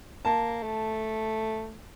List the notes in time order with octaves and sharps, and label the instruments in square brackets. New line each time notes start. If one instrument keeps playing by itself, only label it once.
[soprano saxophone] A#3 [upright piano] A5
[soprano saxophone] A3